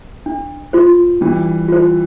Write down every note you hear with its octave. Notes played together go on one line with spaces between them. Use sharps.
D4
F4 C5
E3 G3 D4
F4 C5